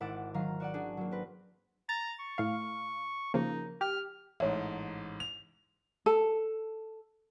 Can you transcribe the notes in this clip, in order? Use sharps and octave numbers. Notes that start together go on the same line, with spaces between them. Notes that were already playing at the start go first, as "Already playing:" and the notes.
G#1 E4 F#5 D6 A6 E7
D#3 F#3 F5 A#5
F#4 D5 F#5
C#4 D4 F#4 G#4
F#3 A#3
C4 B4
A#5 A6
C#6
A2 F5
C#3 F3 A#3 D#4
G4 F6
A1 G#2 C#5 E5
F7
A4